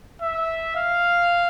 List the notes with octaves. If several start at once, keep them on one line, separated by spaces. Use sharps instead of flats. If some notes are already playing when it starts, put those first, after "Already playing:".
E5
F5